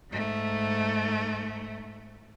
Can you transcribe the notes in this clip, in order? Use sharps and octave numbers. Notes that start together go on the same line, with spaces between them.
G#2 A3